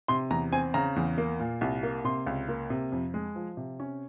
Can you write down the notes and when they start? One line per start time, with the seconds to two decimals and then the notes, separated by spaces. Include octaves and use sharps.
0.08 C3 C6
0.31 E2 A#5
0.52 C4 G#5
0.74 C#3 A#5
0.96 E2
1.18 A#3
1.40 A#2
1.61 C2
1.83 A#3
2.04 C3 C6
2.26 C#2
2.48 A#3
2.70 C3
2.92 F2
3.14 G#3
3.35 F3
3.57 C3
3.80 C#4